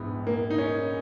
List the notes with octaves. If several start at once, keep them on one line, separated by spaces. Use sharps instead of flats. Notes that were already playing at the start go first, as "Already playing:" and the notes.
Already playing: A#1 G#2 E3 B3
A#3
D#4
C#4